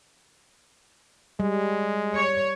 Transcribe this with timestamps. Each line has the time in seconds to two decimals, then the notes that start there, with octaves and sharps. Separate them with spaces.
1.40 G3 G#3
2.15 C#5